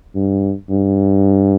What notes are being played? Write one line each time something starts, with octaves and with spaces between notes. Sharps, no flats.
G2
G2